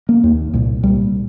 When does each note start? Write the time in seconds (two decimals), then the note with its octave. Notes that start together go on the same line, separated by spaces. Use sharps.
0.09 A#3
0.24 D#2
0.53 C2 A#2
0.83 C2 A#2 G3